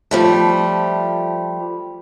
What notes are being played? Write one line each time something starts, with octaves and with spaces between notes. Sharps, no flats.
F3 G3 A3